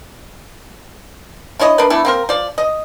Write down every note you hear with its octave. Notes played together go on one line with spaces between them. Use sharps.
D4 E4 C#5 D#5
D4 A#4 B4
A3 B3 D4 E4
A#3 C4 A#4
F3 D5
D#5